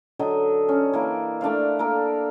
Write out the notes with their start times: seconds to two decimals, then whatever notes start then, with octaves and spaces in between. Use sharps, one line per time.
0.19 D3 F#3 A4 D#5
0.69 C#4
0.93 E3 A#3 D5
1.41 A3 D4 D5 F5
1.79 A#3 A4 A#4